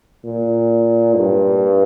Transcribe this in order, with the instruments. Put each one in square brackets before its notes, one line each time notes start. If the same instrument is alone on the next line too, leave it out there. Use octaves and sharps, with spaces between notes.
[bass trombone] A#2
G2